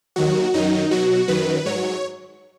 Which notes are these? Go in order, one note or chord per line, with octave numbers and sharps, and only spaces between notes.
D#2 D#3 F#3 F#4
F#2 D#3 F#3 D#4
B2 F#3 F#4
F#2 D#3 F#3 B4
G#2 F#3 C#5